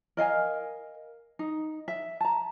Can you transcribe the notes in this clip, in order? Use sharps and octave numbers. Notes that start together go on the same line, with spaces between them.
A#4 D#5 F5 G#5
D#4
E5
A5 A#5